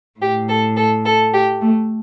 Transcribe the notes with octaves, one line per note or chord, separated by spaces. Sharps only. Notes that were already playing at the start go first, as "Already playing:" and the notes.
A2 G4
A4
A4
A4
G4
A3